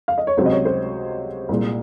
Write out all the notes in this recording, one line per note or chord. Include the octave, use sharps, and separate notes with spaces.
F5
D#5
C#5
C#2 C3 F#3 C5
D#5
C#5
C5
C2 A#2 G#3